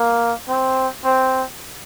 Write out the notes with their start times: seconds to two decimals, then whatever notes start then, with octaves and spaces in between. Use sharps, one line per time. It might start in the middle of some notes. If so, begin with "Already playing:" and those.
Already playing: A#3
0.49 C4
1.05 C4